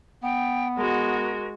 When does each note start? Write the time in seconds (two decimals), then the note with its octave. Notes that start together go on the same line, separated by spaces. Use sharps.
0.23 B3 G5
0.78 G#3 F#4 A#4